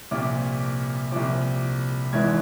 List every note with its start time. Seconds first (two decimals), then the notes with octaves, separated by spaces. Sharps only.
0.11 C2 A#2 F3 D6
1.12 C2 A#2 F3 D6
2.13 G#1 G#2 E3 G#6